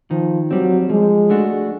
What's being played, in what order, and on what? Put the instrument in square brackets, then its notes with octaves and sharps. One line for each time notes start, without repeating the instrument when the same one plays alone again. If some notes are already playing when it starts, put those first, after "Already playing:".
[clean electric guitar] D#3 [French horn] F3
[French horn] F#3 [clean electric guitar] G3 C4
[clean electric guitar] F3 [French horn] G#3
[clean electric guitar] A3 D4 F#4